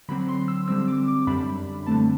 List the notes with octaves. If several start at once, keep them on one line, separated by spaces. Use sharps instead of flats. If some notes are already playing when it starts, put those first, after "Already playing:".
D3 F#3 C4 B5
C6
E6
D3 G3 C4 E6
D6
D6
F#2 D3 G3 D4 B5
D3 A3 C4 A5